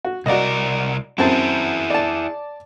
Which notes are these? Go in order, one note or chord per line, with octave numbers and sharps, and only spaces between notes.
F#4
C2 F#4 A#4 D5 D#5
F#2 C4 E4 G#4 A5
D5 A5